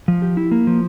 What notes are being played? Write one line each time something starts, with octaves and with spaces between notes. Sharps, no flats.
F3
G4
E4
A#3
F3